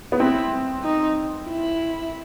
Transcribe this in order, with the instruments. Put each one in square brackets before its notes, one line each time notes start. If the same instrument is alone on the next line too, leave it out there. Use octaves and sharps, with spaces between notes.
[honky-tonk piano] B3
[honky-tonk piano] C4 [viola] E4
[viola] D#4
E4